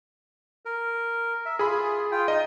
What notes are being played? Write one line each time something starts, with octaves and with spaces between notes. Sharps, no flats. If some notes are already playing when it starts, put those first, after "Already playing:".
A#4
E5
F4 G#4 B5
F4 G5
D#4 D#5